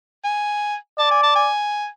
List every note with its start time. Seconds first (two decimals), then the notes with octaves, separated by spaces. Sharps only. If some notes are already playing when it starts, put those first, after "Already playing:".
0.24 G#5
0.99 D5 A5
1.11 G#5
1.23 A5
1.36 G#5